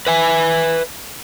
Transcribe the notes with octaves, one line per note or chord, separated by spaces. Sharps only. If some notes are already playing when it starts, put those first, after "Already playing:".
B4 E5 G#5